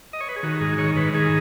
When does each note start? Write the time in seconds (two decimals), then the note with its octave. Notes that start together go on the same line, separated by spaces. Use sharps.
0.13 D#5
0.21 C#5
0.28 B4
0.36 G#4
0.43 D#3 F#4
0.61 G#2 G#4
0.78 D#3 C#5
0.96 G#2 B4
1.14 D#3 G#4